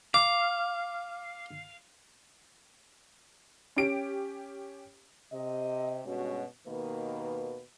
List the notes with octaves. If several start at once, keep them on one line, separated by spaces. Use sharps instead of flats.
F5 D6
C#4 G4 D7
C3 D#5
G2 B2 G#3 C#4 F#4 C#5
D#2 B2 D#3 A#3 B4